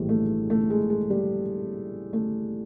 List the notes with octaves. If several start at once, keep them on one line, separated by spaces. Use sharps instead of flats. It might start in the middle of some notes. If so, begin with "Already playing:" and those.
Already playing: A#1 A2 E3 G3 G#3
A3
A3
G#3
G#3
G3
A3